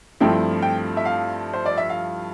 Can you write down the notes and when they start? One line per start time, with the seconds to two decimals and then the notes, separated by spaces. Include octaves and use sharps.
0.20 G2 F3 A3 C4 E4 G5
0.62 G5
0.97 E5
1.05 F5
1.53 C5
1.66 D5
1.78 E5
1.89 F5